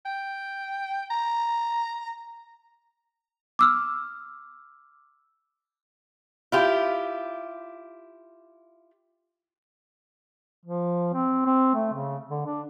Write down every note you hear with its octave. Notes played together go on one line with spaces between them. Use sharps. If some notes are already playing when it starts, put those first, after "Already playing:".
G5
A#5
D6 E6 F6
E4 F4 G4
F3
C4
C4
A3
C#3
D3
D4